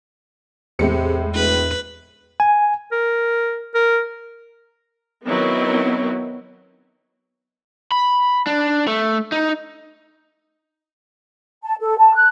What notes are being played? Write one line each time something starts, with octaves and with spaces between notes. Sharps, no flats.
E2 A2 C3 G#3 C#7
E1 B4
G#5
A#4
A#4
D#3 F#3 B3 C4 D#4 E4
B5
D4
A3
D#4
A5
A4
A5
F#6